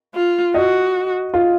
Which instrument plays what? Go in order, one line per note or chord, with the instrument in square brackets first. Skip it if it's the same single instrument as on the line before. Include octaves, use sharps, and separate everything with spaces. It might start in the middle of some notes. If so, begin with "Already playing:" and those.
[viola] F4
[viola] F#4 [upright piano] D#5
[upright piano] F4